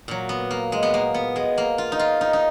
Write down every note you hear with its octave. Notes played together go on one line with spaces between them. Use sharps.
A#2 F#3
B3
A#3
G#3
B3
A#3
B3
G#3
A#3
F4
D#4
F4
D#4
D#4